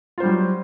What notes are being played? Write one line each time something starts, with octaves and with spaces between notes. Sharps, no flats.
F#3 G3 F4 C5